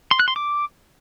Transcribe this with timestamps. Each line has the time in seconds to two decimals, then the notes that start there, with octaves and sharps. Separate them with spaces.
0.11 C6
0.20 F#6
0.28 C6
0.36 D6